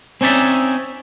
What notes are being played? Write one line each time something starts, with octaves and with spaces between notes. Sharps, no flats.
C4 C#4 D#4 D5 E5